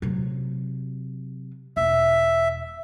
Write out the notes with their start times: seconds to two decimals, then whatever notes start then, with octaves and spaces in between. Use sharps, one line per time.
0.02 C3 F#3
1.77 E1 E5